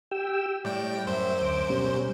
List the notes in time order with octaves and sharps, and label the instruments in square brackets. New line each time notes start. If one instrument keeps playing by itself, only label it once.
[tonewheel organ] G4 G5 E6
[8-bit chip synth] A2 G5 [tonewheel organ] G3 D5
[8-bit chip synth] F#2 C5 [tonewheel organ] E5
[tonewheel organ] D2 D6
B2 G3 C#4